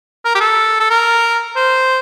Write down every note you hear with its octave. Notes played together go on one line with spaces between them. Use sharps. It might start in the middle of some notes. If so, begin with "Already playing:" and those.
A#4
G4
A4
A4
A#4
C5